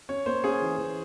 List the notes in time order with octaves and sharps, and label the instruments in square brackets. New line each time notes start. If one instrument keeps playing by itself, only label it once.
[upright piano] C#4 [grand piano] C#5
[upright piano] A#3 [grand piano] C5
[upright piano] C#4 [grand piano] G#4
[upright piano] E3
E3